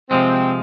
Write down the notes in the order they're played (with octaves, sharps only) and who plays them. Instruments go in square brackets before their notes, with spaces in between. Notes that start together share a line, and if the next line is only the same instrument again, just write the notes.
[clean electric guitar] C3 F3 G#3 [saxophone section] C4